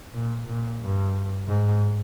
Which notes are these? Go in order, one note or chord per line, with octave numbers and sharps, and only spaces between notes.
A#2
A#2
G2
G#2